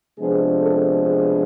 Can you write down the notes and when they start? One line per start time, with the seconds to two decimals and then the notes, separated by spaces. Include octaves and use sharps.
0.19 C3 F3 G#3 B3 D4 G#4
0.60 A4
1.02 G#4